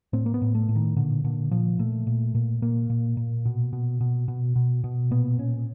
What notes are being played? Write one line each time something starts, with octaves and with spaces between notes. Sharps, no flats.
A2 C4
A#3
B3
A2
A3
A2
D#3
A#2 D3
A#2 D3
A#2 F3
A#2 A3
A#2
A#2
A#2 A#3
A#2
A#2
B2
B2
B2
B2
B2
B2
A#2 B3
A#2 C#4